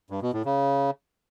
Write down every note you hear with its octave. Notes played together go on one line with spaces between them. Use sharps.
G2
B2
A2
C#3